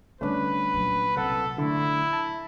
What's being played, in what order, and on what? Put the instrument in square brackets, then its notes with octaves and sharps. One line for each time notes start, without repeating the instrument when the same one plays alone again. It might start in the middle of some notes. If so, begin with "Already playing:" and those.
[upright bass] D3 G3 [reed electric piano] A3 C#4 D4 [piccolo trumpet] B4
[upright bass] A#2 F#3
[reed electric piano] C2 F#5 [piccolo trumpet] A4
[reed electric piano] D3 A3 [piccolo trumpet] E4
[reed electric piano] A5